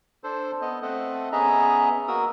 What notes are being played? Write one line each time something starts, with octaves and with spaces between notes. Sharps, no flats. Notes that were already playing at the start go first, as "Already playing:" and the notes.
D4 A4 C5
B3 D#5
A3 C4 A4 D#5 F#5
B3 C#4 G#4 D#5 E5 A#5
A#3 F#4 A#4 D#6 E6